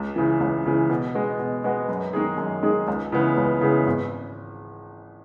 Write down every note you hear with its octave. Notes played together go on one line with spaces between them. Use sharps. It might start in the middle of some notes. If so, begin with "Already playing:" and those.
Already playing: C#2
C#3 E3
C#2
C#3 E3
B2
G#3 B3 F#4
B2
G#3 B3 F#4
F#2
D#3 G#3 D#4 G#4
F#2
D#3 G#3 D#4 G#4
C#2
C#3 E3 G#3 B3
C#2
C#3 E3 G#3 B3
G#1